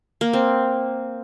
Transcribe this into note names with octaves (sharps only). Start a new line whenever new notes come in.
A#3
C4